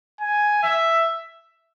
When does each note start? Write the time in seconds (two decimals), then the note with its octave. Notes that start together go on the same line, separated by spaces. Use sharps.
0.21 G#5
0.63 E5